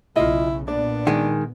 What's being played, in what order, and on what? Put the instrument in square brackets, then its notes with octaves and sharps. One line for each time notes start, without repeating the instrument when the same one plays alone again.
[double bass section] B1 C#3 [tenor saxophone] E4 [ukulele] F4 D#5
[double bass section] A#2 B3 [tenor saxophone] D4 [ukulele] D5
[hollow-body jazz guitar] D#3 G#3 [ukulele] G#5